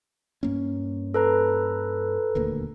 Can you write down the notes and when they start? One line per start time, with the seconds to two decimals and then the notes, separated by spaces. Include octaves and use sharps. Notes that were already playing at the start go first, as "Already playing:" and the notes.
0.43 G2 A#3 C#4
1.14 A4 B4 A#5
2.35 D#1 D2 A#3